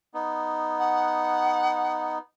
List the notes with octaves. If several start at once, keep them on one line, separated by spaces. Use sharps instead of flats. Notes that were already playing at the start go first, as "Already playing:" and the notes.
B3 D#4
F#5